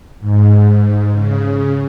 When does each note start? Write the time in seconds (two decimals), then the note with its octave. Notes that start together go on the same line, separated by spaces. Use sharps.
0.20 G#2
1.13 C#3